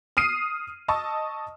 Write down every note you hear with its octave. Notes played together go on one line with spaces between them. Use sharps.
D#6 F6 C7 D#7
D#5 A5 C#6 D#6 E6